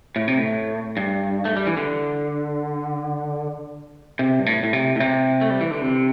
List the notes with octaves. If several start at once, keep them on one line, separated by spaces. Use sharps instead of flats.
A2
C3
A2
G2
A3
G3
E3
D3
C3
G2
A2
A2
C3
A2
C3
A3
G3
E3
D3
C3